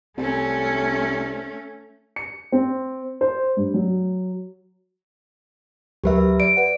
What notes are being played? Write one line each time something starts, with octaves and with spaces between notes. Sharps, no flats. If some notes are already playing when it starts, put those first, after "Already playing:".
C2 A3 C#4
C#7
C4
C5
G2
F#3
D2 F#3 G4 A#4 B4 E5
D5 D7
B4 F#5